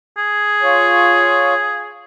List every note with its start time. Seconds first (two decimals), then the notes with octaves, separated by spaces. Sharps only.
0.17 G#4
0.63 F4 C#5